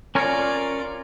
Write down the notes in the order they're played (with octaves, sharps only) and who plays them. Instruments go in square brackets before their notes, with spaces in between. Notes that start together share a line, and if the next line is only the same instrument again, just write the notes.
[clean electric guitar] C#4 A#4 C#5 [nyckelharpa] F4 D5